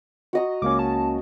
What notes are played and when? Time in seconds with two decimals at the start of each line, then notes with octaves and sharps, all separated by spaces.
0.33 F#4 D#5 A#5
0.62 C#2 A#3 C#4 D6
0.79 A5